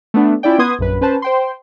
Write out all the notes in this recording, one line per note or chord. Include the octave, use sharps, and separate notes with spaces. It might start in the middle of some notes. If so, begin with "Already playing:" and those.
A3 B3 D4
C#4 E4 F4 D5 G5
B3 B4 C6 D#6 G#6
A#1 F#2 B4
C#4 B4 C5 A5
C5 G5 C6